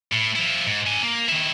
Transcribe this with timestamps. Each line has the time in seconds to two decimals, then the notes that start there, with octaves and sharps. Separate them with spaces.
0.12 A2
0.36 F3 E4
0.67 G#2
0.86 D4 G#5
1.03 A#3
1.29 D#3 E4